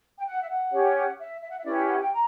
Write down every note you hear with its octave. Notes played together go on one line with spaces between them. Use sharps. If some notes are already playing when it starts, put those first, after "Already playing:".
G5
F#5
E5
F#5
C#4 G4 C#5
E5
E5
F#5
E5
C#4 E4 G4 B4 D5
E5
F#5
G5
A#5